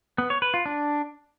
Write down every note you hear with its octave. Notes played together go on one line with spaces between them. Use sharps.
B3
C#5
B4
F4
D4